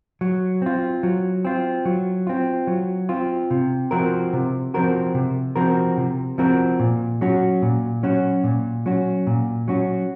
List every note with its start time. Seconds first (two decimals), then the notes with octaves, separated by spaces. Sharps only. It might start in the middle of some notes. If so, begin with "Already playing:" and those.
0.21 F#3
0.62 C4 F4
1.03 F#3
1.45 C4 F4
1.85 F#3
2.27 C4 F4
2.67 F#3
3.09 C4 F4
3.51 C3
3.91 F3 C4 F#4 A#4
4.33 C3
4.74 F3 C4 F#4 A#4
5.15 C3
5.56 F3 C4 F#4 A#4
5.97 C3
6.38 F3 C4 F#4 A#4
6.79 A#2
7.21 F#3 C#4 F#4
7.62 A#2
8.03 F#3 C#4 F#4
8.44 A#2
8.86 F#3 C#4 F#4
9.27 A#2
9.68 F#3 C#4 F#4